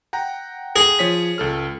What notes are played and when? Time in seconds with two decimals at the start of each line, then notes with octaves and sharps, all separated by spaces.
0.13 F#5 G5 A#5
0.76 G#4
0.99 F3 C#5 B6
1.38 C#2 A4 F6